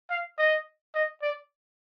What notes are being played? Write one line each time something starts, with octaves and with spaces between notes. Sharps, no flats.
F5
D#5
D#5
D5